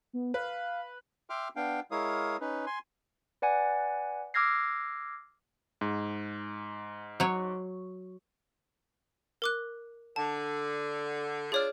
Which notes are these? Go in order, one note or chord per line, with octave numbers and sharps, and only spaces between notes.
B3
B4 F5
E5 G5 C6 D6 F6
B3 D4 F5 G5
G#3 E4 A#4 C#5 F5 D#6
C#4 D#4 B4
G#5 C6
B4 D5 F#5 G#5
D6 E6 F6 G#6 A#6 C7
G#2
F#3 C#5
A#4 D6 F#6
D3 A5
D4 F4 G#4 C#5 D5 F6